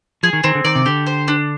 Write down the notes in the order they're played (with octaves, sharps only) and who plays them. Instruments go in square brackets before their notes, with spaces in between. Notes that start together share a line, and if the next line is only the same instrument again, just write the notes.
[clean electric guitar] F3 [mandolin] G#4
[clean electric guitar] D#3
[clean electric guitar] D#3 [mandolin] C4
[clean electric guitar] D3
[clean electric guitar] D#3 [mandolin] D5
[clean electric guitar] C3
[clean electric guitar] D3 [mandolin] G4
[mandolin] C5
D4